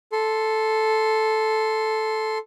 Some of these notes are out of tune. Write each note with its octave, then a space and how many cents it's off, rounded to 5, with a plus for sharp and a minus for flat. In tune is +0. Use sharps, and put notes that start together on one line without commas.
A4 -5 C6 +0